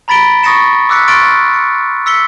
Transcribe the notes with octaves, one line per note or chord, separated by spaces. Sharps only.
A#5 B5 A6 B6 D7 G7
C#6 D#6 A6 A#6 C#7 E7
D6 E6 F#6 B6 C#7
C6 C#6 F6 A6 D7
C#7
E6 B6 C#7 G7